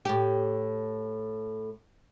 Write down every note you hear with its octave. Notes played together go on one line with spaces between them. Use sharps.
A2 G4